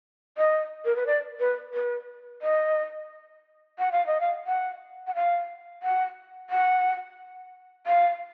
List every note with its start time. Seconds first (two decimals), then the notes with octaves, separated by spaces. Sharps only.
0.38 D#5
0.85 A#4
0.96 B4
1.07 D5
1.40 B4
1.74 B4
2.42 D#5
3.79 F#5
3.92 F5
4.07 D#5
4.21 F5
4.47 F#5
5.07 F#5
5.15 F5
5.83 F#5
6.50 F#5
7.87 F5